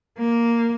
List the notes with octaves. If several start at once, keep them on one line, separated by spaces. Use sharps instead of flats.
A#3